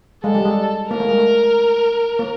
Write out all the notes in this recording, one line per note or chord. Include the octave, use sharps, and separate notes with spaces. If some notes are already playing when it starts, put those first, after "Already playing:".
G#3 A4
G3
G#3
A#3 A#4
A3
G#3
A3
A#3